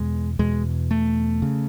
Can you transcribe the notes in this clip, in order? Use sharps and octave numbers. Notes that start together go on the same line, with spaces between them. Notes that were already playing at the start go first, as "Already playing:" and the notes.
Already playing: E2 B2 G#3
E2 B2 G#3
A3
C#3